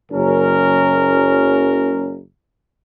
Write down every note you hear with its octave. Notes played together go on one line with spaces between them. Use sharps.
F#1 C#4 A#4